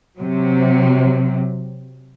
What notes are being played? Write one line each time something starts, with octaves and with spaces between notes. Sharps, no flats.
C3 F#3